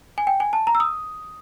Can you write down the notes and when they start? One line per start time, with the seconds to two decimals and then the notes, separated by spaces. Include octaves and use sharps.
0.18 G#5
0.27 G5
0.40 G#5
0.53 A5
0.67 A#5
0.75 E6
0.80 D#6